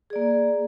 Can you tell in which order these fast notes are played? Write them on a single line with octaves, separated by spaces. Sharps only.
G#4 D5 A#3